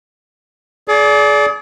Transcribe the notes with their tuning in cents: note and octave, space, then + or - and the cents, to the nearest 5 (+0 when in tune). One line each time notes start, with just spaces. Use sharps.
G#4 +35 D5 -20 D6 +0